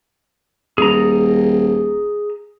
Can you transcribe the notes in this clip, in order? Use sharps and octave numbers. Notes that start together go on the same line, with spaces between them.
D#1 G#4 A#5